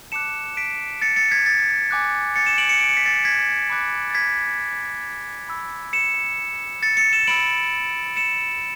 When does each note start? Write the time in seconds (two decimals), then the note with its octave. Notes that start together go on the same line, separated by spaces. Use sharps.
0.12 A5 D6 F#6 C#7 E7
0.57 B6 D7
1.02 A6 C#7
1.16 A6 C#7
1.31 G#6 B6
1.46 A6
1.91 G#5 D6 F#6
2.36 A6 C#7
2.46 C#7 E7
2.58 D7 F#7
2.69 C#7 E7
2.80 D7
2.89 C#7
2.97 B6
3.05 A6 C#7
3.25 G#6 B6
3.70 B5 D6 F#6
4.10 A6
4.15 G#6 B6
5.49 B5 E6
5.93 C#7 E7
6.83 A6 C#7
6.97 A6 C#7
7.12 C#7 E7
7.27 B5 E6 D7 F#7
8.17 C#7 E7